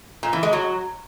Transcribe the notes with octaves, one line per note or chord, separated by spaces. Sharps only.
A#2
E3
G#3
F#3